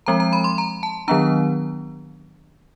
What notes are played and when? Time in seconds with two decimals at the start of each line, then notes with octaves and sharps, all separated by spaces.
0.06 F3 G#3 C4 A#5
0.20 A#5
0.33 B5
0.44 C6
0.58 A#5
0.83 A5
1.08 D#3 F#3 B3 D4 A#5